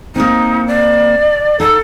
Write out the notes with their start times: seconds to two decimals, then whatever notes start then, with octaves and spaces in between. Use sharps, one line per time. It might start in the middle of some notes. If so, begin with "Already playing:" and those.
0.16 A#3 C4 D#4
0.67 D5
1.60 D#4 A4 F#5